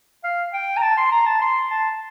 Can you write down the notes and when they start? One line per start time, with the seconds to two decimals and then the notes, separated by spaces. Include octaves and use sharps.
0.24 F5
0.53 G5
0.77 A#5
0.82 A5
0.97 C6
1.11 A#5
1.26 A5
1.41 C6
1.71 A5